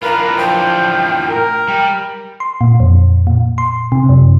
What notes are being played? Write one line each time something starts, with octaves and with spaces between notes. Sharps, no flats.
A2 D4 F4 A#4 B4
F3 G5
A#4
G3
C6
A#2
F2
A#2
C6
C3
F#2